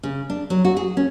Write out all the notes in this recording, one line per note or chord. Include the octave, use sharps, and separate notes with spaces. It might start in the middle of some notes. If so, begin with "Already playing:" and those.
C#3
D4
F#3
F#4
G#4
C#4